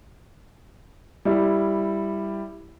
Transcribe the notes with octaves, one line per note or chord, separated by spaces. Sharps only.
G3 E4